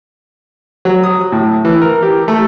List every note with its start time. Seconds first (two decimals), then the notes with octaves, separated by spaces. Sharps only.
0.85 F#3
1.04 D#6
1.32 A2
1.65 E3
1.82 A#4
2.03 G4
2.28 A3